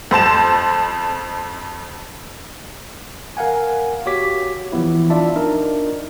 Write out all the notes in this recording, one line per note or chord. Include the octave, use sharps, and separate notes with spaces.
F2 C5 A5 E7
A#4 F5 F#5 G#5
F#4 G4 C#5 D6 B6
E3 F3 B3 E4
D4 F4 D5 E5 A5
D4 D#4 A#4